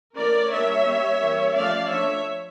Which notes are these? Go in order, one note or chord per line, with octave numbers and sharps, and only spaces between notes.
E3 A3 C#4 A#4 D5
G3 A#3 D4 C#5 E5
G3 A#3 C#4
E3 G3 A#3 C#4
F3 A3 C#4 D5 F5
F3 A3 D4 C#5 E5